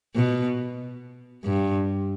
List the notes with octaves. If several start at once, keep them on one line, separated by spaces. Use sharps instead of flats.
B2
G2